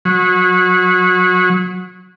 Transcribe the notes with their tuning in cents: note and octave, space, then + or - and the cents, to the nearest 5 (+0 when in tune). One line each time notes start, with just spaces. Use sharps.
F#3 -25